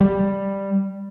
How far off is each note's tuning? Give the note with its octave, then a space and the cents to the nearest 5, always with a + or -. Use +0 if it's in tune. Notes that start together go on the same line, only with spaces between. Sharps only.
G3 +5